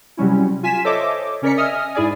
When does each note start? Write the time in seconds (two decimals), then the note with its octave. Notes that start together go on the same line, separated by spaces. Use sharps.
0.17 C3 F#3 G3 C#4 E4
0.63 F4 G#5 B6 E7
0.84 A4 C5 C#5 D#5 E5 D6
1.42 C#3 C#4 A#4 D5 B6 C#7
1.57 D#5 E5 G#5 D#6 F6
1.95 G#2 E4 G#4 D5 G#5